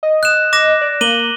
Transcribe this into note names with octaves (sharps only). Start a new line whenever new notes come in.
D#5
F#6 E7
D6 A#6 E7
D5
A#3 D#7 F#7 G7